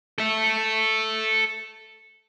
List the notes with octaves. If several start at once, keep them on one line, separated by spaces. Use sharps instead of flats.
A4 E5